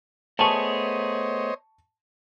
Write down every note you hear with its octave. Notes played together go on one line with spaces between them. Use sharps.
A3 B3 G#4 C5 C#5 D#5 A5 C#6